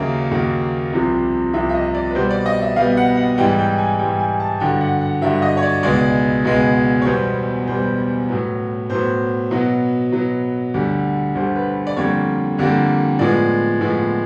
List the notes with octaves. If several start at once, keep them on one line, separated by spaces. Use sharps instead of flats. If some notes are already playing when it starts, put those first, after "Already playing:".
Already playing: D#2 C#3 F#3 A#3 E5
D#2 C#3 F#3 A#3
C2 C3 F3
C2 C3 F3 E5
E5
D#5
D5
B4
B2 G3 B3 C5
D5
D#5
E5
B2 G3 B3 F5
F#5
F#5
G#2 E3 G3 G5
G5
G#5
G#2 E3 G3 G5
G#5
A5
G2 D3 F#3 G5
F#5
F#5
G2 D3 F#3 E5
D#5
C#5
D5
C#2 B2 G#3 B3 D5
C#2 B2 G#3 B3
C#5
E2 B2 G3 B3 C5
E2 B2 G3 B3 C5
A2 F#3 B3
A2 F#3 B3 C5
B2 F#3 B3
B2 F#3 B3
D2 D3 G3
D2 D3 G3 C5
B4
D5
F2 D3 G3 A#3 C#5
F2 D3 G3 A#3
A2 F3 G#3 B3 D5
A2 F3 G#3 B3